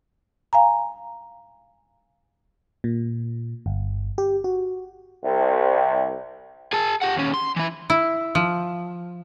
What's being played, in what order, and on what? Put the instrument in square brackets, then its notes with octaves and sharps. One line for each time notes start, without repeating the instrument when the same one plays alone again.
[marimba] F5 G#5 A#5
[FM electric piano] A#2
G1
G4
F#4
[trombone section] C2
[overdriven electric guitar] G#4 A5
G4 F#5
D#2 C#4
C6
E3 E4
[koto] E4
F3